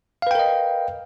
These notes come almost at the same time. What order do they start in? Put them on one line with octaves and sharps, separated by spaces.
F5 B4 G5 A#4 D#5